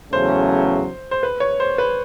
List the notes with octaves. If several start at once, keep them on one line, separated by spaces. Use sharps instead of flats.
E2 C#3 F#3 A3 C#4 C5
C5
B4
C#5
C5
B4